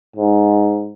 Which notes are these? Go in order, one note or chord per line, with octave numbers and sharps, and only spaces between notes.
G#2